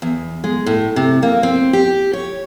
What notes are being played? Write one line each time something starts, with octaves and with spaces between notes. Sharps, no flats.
E2
G#3
A2
C3
A#3
C4
G4
C#5